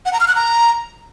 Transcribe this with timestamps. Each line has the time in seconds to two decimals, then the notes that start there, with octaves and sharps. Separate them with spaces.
0.06 F#5
0.13 A#5
0.20 F6
0.28 F#6
0.35 A#5